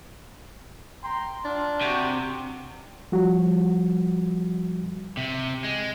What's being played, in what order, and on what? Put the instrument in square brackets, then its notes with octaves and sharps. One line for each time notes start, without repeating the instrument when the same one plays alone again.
[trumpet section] G5 A#5 C6
[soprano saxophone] D4 [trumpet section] F4
[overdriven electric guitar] C3 [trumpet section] F#4 G4
[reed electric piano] F3 G3 F#4
[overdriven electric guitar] C3
G#3